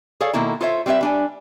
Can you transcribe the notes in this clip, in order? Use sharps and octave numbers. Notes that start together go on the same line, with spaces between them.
G#4 A4 C#5 D5 F5
B2 D#3 A#3 E4 A4
F4 A4 C5 C#5 D#5 E5
G3 C4 B4 C#5 E5
G3 D4 G#5